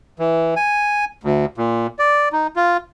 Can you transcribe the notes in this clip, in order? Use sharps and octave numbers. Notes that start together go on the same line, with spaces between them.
E3
G#5
D2
A#2
D5
D#4
F4